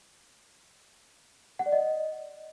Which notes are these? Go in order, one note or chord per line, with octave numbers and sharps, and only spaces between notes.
F#5
D5
D#5